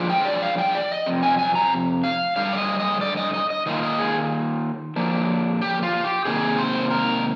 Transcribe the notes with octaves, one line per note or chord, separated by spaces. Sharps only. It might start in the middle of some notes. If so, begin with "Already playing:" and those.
Already playing: D3 F3 G#3 D4 F4
G5
D5
F5
G5
D5
D#5
F2 C3
G#5
G#5
A#5
F5
G2 D3 G3 F5
D5
D#5
D#5
D5
D#5
D#5
D#5
D#3 A#3 F4 D#5
D#5
G#4
D3 F3 A#3 D4
G4
F4
G4
C3 D#3 A#3 G#4
C5
A#4